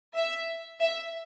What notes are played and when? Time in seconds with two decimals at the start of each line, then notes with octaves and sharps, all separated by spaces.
0.15 E5
0.80 E5